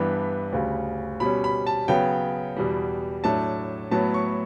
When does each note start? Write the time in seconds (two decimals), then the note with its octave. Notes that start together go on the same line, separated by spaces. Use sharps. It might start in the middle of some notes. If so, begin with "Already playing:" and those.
Already playing: G2 E3 B3 D4 B5
0.52 D2 C#3 G3
1.20 B2 G3 C#4 B5
1.44 B5
1.67 A5
1.88 C#3 F#3 B3 G5
2.56 E2 B2 G3
3.24 A2 F#3 A3 D4 A5
3.91 A2 F#3 B3 A5
4.14 C#6